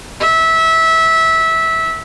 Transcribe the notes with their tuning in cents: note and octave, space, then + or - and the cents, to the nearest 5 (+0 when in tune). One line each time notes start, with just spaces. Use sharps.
E5 -20